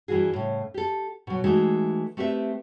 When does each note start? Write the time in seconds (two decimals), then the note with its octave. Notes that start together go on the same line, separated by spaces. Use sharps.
0.08 G2 E3 F4 F#4 G#4
0.33 A2 C#3
0.74 G4 A4
1.27 B2 F#3
1.44 E3 G#3 A3 D#4 F#4
2.17 A3 C4 G4 B4 E5